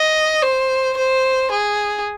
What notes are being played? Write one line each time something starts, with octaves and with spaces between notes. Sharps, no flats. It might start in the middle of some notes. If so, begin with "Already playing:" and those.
Already playing: D#5
C5
C5
G#4